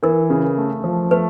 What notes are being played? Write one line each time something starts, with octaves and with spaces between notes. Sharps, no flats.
E3 A#4
C#3
A3
F3
A3 B4